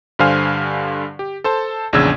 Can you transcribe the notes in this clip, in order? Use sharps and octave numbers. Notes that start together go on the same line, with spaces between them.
G2 D3 C5 F5 G#5 F6
G4
A4 C5 A5
A#1 E2 C#3 D4 E6 G#6